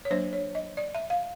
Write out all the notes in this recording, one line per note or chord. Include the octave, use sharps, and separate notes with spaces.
C#5
F#3 A#3 D4 C5
C#5
D#5
D5
E5
F5